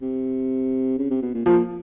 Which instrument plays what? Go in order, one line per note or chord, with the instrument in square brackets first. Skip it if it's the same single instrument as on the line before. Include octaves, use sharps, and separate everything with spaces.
[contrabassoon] C3
C#3
C3
B2
A#2
[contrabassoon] A#2 [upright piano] F3